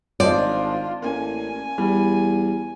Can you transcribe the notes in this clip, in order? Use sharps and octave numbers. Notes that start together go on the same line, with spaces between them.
G#1 D4 F4 C5 D5 D#5
A1 A#3 G#5
E2 G3